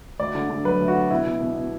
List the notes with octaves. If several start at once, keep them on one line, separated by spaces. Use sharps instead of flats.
D2 D5
D3
D3
F#3 B4
D2
F#4
D3
B2 E4
B2
B2
B2